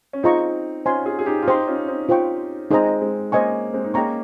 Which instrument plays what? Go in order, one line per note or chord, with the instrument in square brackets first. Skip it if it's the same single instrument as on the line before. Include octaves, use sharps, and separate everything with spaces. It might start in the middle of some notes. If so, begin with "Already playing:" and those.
[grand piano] C#4
[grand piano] C4 D#4 [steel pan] F4 G#4 D#5 A#5 C#6
[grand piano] C#4 F4 [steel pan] C5 D#5 G#5 C6
[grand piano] F4 G#4
G#4
D#4 G4
F4
[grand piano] D#4 G4 [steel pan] C5 G5 C6
[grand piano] C#4 F4
C4 D#4
[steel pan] F4 C5 G5 C#6
[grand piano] G#3 C4 [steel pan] D#4 G#4 C5 D#5 A#5
[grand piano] G#3 C4
[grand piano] A#3 C#4 [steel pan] C5 D#5 G#5 C#6
[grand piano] G#3 C4
D#4
[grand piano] A#3 C#4 [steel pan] G#4 D#5 G5 A#5 C#6